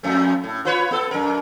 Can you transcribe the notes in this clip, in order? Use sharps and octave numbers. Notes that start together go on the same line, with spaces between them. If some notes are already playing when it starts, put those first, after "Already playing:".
F2 A3
A2
F4 B4 C#5
B3 A4
F#2 A#4